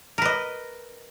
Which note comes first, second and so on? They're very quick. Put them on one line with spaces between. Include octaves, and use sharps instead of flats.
A#4 B4 D#5